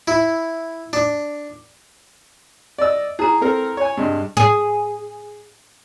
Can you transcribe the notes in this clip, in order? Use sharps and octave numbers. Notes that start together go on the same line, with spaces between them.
E4
D4
D5 D#5 E6
E4 G#4 A#5
C4 A4 A#4
C#5 G#5
G2 C3 G#3
G#4